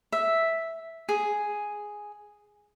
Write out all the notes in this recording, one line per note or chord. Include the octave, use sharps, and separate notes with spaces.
E5
G#4